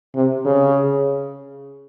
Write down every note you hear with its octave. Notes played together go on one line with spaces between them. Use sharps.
C3
C#3